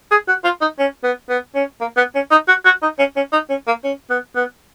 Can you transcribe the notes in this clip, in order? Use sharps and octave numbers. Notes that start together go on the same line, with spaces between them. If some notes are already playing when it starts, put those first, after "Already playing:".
G#4
F#4
F4
D#4
C#4
B3
B3
C#4
A#3
B3
C#4
D#4
F#4
F#4
D#4
C#4
C#4
D#4
C#4
A#3
C#4
B3
B3